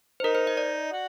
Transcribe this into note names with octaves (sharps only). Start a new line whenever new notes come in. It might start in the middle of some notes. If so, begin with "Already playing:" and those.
C5
D#4 A#4
C5
D#5
D5
F#4